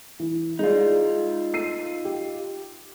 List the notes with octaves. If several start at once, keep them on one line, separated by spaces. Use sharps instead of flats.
E3
G#3 D#4 F4 G#4 D5
E6 C7 D#7
G4